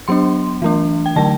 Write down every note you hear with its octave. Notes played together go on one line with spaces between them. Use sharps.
F#3 B3 D4 C6
E3 A3 D4
G5
D3 F#3 A3 A5